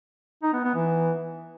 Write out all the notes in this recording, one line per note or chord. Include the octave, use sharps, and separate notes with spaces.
D#4
B3
B3
E3